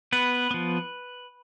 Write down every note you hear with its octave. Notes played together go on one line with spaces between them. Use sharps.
B3 B4
F3 B3